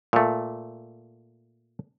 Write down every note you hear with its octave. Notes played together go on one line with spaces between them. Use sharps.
A#2 A3